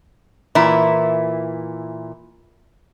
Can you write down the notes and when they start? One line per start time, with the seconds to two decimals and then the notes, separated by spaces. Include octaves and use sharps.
0.55 A#2 E3 E4